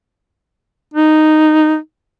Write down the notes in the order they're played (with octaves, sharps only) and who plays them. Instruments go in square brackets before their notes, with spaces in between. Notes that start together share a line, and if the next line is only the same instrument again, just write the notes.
[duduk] D#4